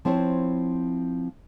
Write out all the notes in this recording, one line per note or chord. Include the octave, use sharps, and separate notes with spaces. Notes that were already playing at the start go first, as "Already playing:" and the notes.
F3 C4 E4 C#5